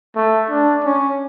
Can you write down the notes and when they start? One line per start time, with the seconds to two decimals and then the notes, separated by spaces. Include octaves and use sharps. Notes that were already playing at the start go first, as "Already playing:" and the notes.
0.16 A3
0.50 D4
0.84 C#4